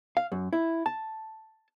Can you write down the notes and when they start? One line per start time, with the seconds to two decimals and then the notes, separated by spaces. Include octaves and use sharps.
0.17 F5
0.32 F#2
0.53 E4
0.86 A5